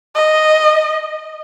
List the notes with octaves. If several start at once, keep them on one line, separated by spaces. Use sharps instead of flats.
D#5